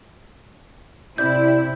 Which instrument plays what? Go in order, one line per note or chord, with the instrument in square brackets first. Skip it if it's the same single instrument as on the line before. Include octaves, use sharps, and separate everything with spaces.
[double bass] C3 C4 [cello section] E4 [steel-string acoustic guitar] G4 D5 [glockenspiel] G6